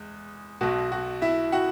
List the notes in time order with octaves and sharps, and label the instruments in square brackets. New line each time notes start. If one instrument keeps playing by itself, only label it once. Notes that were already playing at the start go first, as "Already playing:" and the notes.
Already playing: [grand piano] E2 G#3
B1 B2 F#4
F#4
E4 E5
F#4 F#5